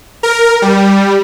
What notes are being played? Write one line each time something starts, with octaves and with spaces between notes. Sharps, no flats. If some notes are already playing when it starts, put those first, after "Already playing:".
A#4
G3